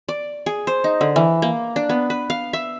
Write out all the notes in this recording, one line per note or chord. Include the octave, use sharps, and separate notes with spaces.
D5
G#4
C5
D#4
D3
E3
A#3
D4
B3
B4
F5
E5